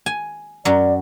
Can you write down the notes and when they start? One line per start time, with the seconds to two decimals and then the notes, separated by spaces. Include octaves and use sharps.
0.06 G#5
0.65 F#2 F#3 D5